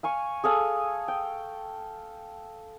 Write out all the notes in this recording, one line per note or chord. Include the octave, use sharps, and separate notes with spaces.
F5 G#5 C#6
G#4 A4 F5 G#5
G5